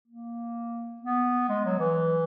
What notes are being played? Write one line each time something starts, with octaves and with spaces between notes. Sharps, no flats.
A#3
B3
G#3
F#3
E3